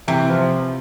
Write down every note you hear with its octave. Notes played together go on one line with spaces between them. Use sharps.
C3 E3
F3